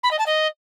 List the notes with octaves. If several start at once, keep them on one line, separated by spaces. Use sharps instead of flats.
B5
D#5
A5
D#5